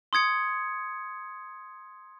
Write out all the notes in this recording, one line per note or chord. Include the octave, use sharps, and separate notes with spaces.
C6 D#6 G#6 C#7